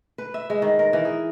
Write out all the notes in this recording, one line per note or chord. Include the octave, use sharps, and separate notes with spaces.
B4
E5
G#3
D#3
A#4
E3
G#4